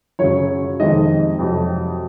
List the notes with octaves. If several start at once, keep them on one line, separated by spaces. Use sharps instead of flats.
F#2 C#3 F#3 C#5
F2 C3 D#3 G#3 D#5
F2 C3 F#3